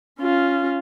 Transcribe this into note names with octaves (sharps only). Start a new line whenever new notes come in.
C#4 F4